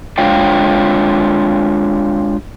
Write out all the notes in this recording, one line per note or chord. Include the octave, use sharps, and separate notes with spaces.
G#3 D4 F4 C#5 F5 G5